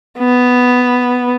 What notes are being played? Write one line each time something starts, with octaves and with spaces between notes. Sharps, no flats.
B3